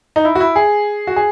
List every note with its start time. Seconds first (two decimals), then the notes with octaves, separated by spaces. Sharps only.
0.16 D#4
0.25 E4
0.35 F#4
0.40 E4
0.56 G#4
1.07 F#4
1.16 G#4